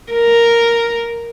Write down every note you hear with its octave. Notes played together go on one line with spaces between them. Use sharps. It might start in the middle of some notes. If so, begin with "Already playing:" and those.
A#4